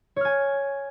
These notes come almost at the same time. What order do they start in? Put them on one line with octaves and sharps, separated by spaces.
C#5 F6 G#5